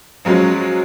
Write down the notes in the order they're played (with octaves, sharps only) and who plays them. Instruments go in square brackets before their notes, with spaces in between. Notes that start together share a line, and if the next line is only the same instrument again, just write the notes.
[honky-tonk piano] F3 F#3 G#3 C#4